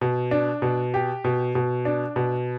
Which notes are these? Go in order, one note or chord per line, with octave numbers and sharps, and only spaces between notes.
B2
D4
B2
G4
B2
B2
D4
B2